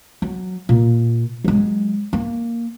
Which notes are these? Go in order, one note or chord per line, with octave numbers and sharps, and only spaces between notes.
F#3
A#2
F#3 G#3
A#3